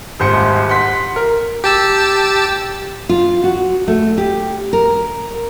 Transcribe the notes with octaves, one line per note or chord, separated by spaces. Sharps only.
D#1 G#1 C5 C#7
F#5 C6 B6
A#4
G4 A5 E6
F4
F#4
A3
G4
A#4